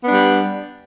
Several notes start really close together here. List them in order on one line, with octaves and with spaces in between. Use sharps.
B3 D4 G3